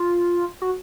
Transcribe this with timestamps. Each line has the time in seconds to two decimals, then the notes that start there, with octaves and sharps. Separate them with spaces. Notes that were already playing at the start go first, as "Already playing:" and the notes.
Already playing: F4
0.62 F#4